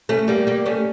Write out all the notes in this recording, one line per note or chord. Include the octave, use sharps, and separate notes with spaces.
A3 C#4
G3 A#3
G3 A#3
A3 C#4